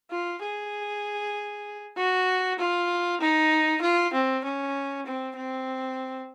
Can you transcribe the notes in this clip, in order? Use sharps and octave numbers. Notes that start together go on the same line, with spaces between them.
F4
G#4
F#4
F4
D#4
F4
C4
C#4
C4
C4